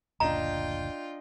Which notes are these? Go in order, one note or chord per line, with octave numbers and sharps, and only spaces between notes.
F#1 D2 A#2 D4 F4 D#5 G5 A#5